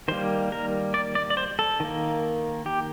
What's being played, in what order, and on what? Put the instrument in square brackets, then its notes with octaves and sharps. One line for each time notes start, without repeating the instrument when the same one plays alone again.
[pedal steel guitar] D#3 G3 A#3 C5
A#4
D5
D5
D5
C5
A4
D#3 A#3
G4